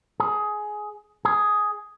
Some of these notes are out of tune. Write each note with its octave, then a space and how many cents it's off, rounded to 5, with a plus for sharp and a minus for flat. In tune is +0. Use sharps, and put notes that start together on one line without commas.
G#4 +15
G#4 +5